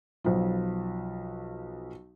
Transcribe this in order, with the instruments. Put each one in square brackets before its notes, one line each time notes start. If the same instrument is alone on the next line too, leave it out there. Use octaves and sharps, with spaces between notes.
[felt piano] B1 F3